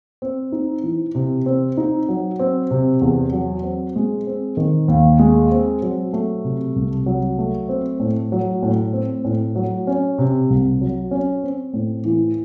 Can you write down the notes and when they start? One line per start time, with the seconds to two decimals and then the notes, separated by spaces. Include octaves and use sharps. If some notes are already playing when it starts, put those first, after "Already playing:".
0.22 C4
0.52 D#4
0.83 E3
1.15 C3
1.46 C4
1.77 D#4
2.08 F#3
2.39 C4
2.71 C3
3.01 E2
3.32 F#3
3.63 C4
3.96 G#3
4.27 C4
4.57 D#3
4.88 D#2
5.19 G#3
5.52 C4
5.82 F#3
6.13 A3
6.44 C3
6.76 C2
7.06 F#3
7.38 A3
7.69 C4
8.00 A2
8.32 F#3
8.63 A2
8.93 C4
9.24 A2
9.55 F#3
9.87 C#4
10.18 C3
10.50 C2
10.81 F#3
11.11 C#4
11.43 C4
11.74 A2
12.05 E3